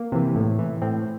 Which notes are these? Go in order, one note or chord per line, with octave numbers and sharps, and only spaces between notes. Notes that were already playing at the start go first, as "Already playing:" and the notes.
Already playing: A#3
C3 E3
A2
E3
A2 C4